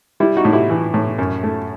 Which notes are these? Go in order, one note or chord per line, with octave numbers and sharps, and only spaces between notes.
G3 E4
D#4 F#4
A2
E4 G4
E3
A2
F#2
A3